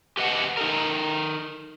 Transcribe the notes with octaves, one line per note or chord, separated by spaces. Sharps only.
G4 B4 D#5 F#5
D#4 A4 A#4